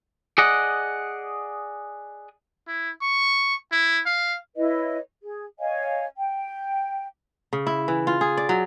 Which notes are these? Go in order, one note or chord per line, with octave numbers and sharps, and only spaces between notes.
G#4 D5 D#5 F#5
E4
C#6
E4
F5
E4 B4 C#5 D#5
G#4
C#5 D#5 F5 G#5
G5
C#3
E4
E3
F4
G#4
D5
F#3